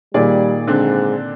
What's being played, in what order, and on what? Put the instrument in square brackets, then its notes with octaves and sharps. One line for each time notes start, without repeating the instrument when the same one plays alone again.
[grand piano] A#2 D#3 [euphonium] G3 [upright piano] G#4 D5
[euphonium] G#2 [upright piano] D3 C4 D4